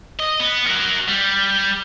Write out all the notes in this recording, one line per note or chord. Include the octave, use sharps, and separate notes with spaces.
D#5
B3
F#4 A#4
G3